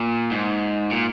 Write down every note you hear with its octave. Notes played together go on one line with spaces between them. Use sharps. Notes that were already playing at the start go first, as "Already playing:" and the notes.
Already playing: A#2
G#2
A#2